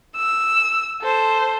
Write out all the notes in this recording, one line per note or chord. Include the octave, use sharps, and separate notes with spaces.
E6
A4 C5